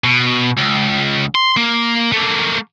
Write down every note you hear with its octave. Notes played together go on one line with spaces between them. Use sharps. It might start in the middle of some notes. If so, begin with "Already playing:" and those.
B2
C#2
C6
A#3
A3 A#3